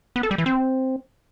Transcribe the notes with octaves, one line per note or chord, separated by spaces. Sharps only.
B3
A4
G3
E3
C4